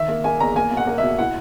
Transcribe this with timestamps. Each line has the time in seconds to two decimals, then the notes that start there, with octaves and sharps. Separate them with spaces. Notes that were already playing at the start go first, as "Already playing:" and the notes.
Already playing: D#3 E5
0.08 A#3
0.24 A#3 G#5
0.40 E2 A#5
0.56 A#3 G#5
0.71 B1
0.77 F#5
0.87 A#3
0.98 B2 E5
1.18 E4 F#5